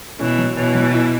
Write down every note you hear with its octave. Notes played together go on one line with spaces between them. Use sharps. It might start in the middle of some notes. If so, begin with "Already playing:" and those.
B2 E3 C#4
F#3
B2 E3 C#5
F#3
E4